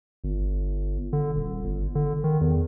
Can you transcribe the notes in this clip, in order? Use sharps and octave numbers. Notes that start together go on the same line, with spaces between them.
G1
D3
D#1
G1
D3
D#3
E2